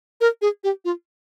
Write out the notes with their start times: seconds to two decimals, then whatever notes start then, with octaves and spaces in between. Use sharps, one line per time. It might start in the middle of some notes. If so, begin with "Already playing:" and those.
0.21 A#4
0.42 G#4
0.64 G4
0.85 F4